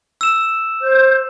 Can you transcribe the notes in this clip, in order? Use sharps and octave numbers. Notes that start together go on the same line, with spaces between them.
E6 E7
C5 G6